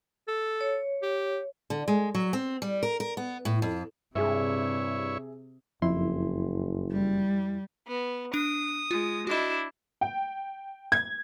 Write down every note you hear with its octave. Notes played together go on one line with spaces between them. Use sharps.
A4
C#5
G4
D3
G#3
F#3
C4
G3
A#4
A#4
B3
A2
F2
G2 C3 E4 G#4 C#5 E5
F#1 F2 E4 C6
G3
B3
D4 D#6 D7
G#3 F4
D4 E4 F#4 D#5
G5
G#6